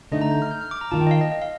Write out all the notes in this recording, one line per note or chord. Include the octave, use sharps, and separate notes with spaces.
D3 A3 D#4 D#5
A#5
G6
F6
G6
F6
D6
A#5
D#3 A#3 F4 A5
G5
D#5
F5
D#5
D#5
F5